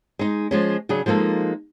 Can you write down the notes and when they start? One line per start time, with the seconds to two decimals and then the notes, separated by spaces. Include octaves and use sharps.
0.19 G#3 D#4
0.51 F3 G#3 C#4
0.89 C#3 F#3 D4 G#4
1.06 F3 G#3 A#3 D#4 A4